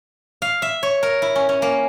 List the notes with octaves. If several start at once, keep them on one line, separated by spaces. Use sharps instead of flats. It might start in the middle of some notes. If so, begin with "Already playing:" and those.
F5
E5
C#5
A#4
E4
C#4
C#4
A#3